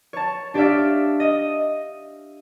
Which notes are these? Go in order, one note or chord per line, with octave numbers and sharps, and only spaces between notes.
C#5 A5
D4 G4 C#5 D5 E5 F5
D#5